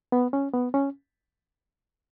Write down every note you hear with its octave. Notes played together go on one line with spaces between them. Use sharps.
B3
C#4
B3
C#4